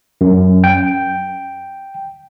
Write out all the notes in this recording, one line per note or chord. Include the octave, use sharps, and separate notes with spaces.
F#2
G5